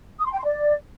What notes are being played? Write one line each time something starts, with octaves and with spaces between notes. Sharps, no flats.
D#6
C6
G5
C6
D5